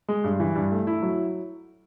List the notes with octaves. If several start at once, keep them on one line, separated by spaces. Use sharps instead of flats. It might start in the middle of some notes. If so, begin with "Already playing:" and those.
G#3
G2
E3
G2
A3
E4
F#3